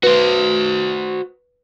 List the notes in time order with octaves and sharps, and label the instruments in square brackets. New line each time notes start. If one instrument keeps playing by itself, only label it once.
[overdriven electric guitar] F#4 C5 [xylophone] B4